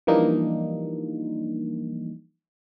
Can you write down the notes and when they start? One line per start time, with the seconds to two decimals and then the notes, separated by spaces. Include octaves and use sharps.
0.07 E3 F3 G3 A#3 D4 D#4